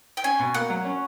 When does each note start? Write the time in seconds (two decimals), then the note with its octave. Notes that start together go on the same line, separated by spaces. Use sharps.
0.17 G5
0.24 C#4 G#5
0.39 B2
0.54 A#3 F#5
0.70 F#3
0.85 C#4